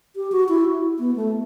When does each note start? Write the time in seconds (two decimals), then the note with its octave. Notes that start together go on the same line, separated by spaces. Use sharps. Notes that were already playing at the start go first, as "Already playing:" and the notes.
0.16 G4
0.32 F#4
0.49 E4
0.99 B3
1.16 A3